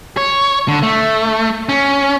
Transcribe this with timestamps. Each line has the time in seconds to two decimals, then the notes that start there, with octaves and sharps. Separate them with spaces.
0.17 C#5
0.68 D3
0.83 A3
1.69 C#4